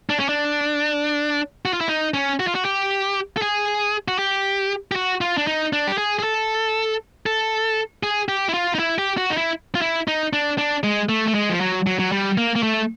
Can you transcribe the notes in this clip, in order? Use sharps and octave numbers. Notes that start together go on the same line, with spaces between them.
D4
C#4
D4
F#4
F4
E4
D#4
C#4
F#4
F4
F#4
G4
A4
G#4
F#4
G4
G4
F#4
F4
D4
D#4
D4
G4
G#4
G#4
A4
A4
G#4
G4
E4
F4
D#4
E4
G4
F#4
D#4
E4
F4
E4
D#4
D4
D4
G#3
A3
A3
G#3
F3
F#3
F#3
F#3
G3
A#3
A#3
A3